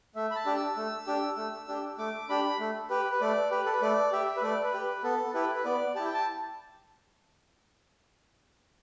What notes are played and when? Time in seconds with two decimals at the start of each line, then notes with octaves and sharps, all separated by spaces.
0.15 A3 E5
0.31 B5
0.36 A5
0.46 D4 G4
0.56 E6
0.77 A3
1.07 D4 G4
1.37 A3
1.68 D4 G4
1.98 A3 D6
2.29 D4 G4 B5
2.60 A3
2.90 G4 B4
3.12 B4
3.21 A3 D5
3.51 G4 B4
3.66 A4
3.73 B4
3.82 A3 D5
4.12 G4 E5
4.37 B4
4.43 A3 D5
4.63 B4
4.74 G4
4.84 B4
5.03 B3 A4
5.34 E4 G4 B4
5.55 B4
5.65 B3 D5
5.95 E4 G4 A5
6.05 G5
6.14 A5